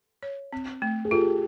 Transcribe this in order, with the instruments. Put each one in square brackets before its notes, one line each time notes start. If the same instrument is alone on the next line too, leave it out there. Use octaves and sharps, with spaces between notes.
[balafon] C#5
C4
A3
[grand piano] G#4
[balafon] F4 [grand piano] G4 A4